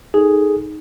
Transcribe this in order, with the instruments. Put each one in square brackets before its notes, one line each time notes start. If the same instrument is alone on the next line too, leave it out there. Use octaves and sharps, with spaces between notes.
[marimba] D#4 [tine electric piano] G#4 A4